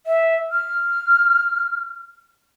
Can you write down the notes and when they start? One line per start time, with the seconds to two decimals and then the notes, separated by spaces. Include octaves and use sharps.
0.06 E5
0.51 F6